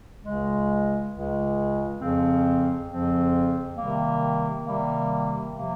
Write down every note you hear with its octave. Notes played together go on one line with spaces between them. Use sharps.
C#2 C#3 G#3
C#2 C#3 G#3
F2 C#3 F3 C4
F2 C#3 F3 C4
C3 D#3 G3 A#3
C3 D#3 G3 A#3
C3 F3 A#3